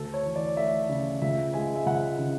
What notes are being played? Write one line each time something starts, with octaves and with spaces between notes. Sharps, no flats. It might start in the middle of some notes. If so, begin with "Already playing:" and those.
Already playing: D2 A4
C#5
E3
D5
A3 E5
C#3
C#2 E5
G#3 G#5
E5
C#2 F#5
C#3